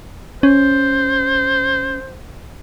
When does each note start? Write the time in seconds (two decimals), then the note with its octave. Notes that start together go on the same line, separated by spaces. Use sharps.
0.43 C#4 C5